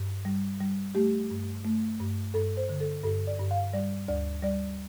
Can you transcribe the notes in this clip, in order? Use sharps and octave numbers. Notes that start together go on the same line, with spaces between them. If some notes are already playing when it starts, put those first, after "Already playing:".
Already playing: G2
G3
G3
A3 G4
G2
A3
G2
G2 A4
C5
D3
A4
G2 A4
D5
G2
F5
G3 D5
D2 D5
G3 D5